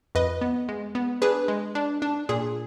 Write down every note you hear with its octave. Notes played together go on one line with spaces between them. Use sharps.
F2 B4 D#5
B3
G#3
B3
D4 G#4 B4
G#3
D4
D4
A#2 G#4